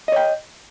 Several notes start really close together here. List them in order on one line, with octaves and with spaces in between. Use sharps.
D#5 C#5 G5